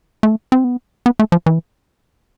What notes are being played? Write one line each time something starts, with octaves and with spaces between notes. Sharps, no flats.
A3
C4
B3
B3
A3
F3
E3